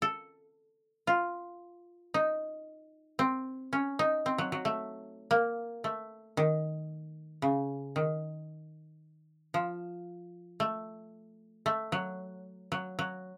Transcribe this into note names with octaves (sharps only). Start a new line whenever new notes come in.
A4
F4
D#4
C4
C#4
D#4
C4
F#3
F#3
A3
A#3
A3
D#3
C#3
D#3
F3
A3
A3
F#3
F#3
F#3